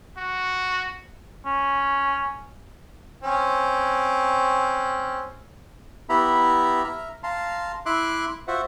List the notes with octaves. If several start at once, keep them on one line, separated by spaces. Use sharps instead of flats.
F#4
C#4
C4 C#4
B3 E4 G4 E5 A#5 B5
E5 A#5 F6
F5 A5 A#5 C6
E4 E5 C6 D6 F#6
F4 F#4 C5 E5 F#5